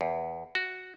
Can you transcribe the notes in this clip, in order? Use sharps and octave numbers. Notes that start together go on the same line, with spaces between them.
E2
F#4